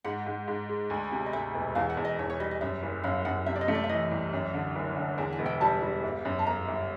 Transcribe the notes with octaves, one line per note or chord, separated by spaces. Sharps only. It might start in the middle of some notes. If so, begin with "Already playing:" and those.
G#2 F#5
G#2
G#2
G#3
D2
C3
D#5
D2 E5
E1
E2 F5
F#5
E2
D#5
E2 C#5
C#5
G3 D#5
D#5
F#2 E5
F#1
F#2 F5
F#2 F#5
C3 E5
D5
D#5
A3
D5
E5
E3 D#5
C2
F#2
D3
F#1
D3
E2 G5
G#5
E1
G5
G3 A5
G3
G1
F#2
A5
G1 A#5
G1